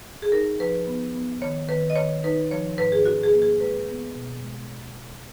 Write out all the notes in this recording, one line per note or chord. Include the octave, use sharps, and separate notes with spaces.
G#4
D#4 A#4
F3 B4
B3
B3
D#3 C#5
D#3 B4
D#5
D#3 C#5
D#4 B4
F3 C#5
G#2 B4
G#4
C#4 F#4
G#4
A#3
G#4
G#3 B4
B3
B2
G#3